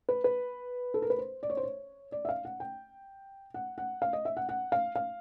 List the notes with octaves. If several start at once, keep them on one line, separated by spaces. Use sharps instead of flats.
B4
B4
A4
A#4
B4
C5
D5
C#5
C5
C#5
D5
E5
F5
F#5
G5
F#5
F#5
F5
D#5
E5
F#5
F#5
F5
F5